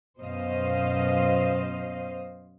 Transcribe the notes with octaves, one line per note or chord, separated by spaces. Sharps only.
F#2 B2 C5 D#5 F5